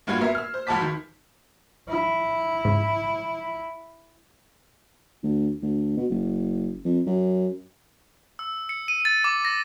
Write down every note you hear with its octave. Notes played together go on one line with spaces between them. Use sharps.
F#1 G2 F4 F#4 G#6
B3 A#4 E5 C7
E6 F6
C5
F1 C#2 F#4 A5 D6 B6
D#3
E4
G#2 C#3
D2
D2
B2
F#1
F2
F#2
E6
C#7
D#7
A6
D6
A#6